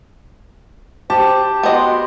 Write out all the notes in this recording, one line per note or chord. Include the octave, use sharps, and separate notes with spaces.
G4 C5 A5
B3 F#4 D#5 G5 C6